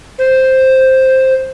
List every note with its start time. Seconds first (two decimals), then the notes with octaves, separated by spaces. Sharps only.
0.18 C5